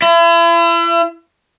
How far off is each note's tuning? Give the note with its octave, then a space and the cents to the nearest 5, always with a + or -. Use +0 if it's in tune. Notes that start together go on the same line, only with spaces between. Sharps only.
E4 +40